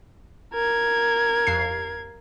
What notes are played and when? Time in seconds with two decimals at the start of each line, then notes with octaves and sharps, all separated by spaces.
0.53 A#4 G#6
1.47 G1 F2 C7